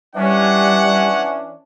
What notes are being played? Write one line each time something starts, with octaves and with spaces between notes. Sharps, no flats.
E3 G3 C#4 D4 F#5